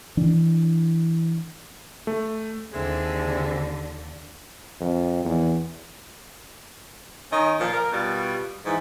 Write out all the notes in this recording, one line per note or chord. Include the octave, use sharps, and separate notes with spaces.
E3 D4
A3
D#2 D3 G#3 C4 E4
F2
E2
D#3 C#4 D#5
A#2 F3
A#4
B2 G3 F4
G#2 E3